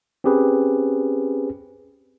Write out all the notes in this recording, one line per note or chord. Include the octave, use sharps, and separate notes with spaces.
C4 C#4 G4 G#4 B4